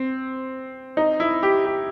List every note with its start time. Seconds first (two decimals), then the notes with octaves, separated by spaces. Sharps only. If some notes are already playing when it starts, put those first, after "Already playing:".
Already playing: C4
0.97 D#4
1.20 E4
1.43 G4
1.66 G4